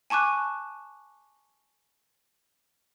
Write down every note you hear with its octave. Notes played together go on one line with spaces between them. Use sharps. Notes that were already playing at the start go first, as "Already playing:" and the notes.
G#5 A5 C#6 D6 F#6